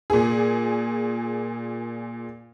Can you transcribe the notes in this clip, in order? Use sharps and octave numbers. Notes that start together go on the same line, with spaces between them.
A#2 G#4